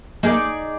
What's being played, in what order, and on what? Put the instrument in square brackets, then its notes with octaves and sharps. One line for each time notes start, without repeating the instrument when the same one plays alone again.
[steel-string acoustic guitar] A#3 [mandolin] D#4 G#4 D5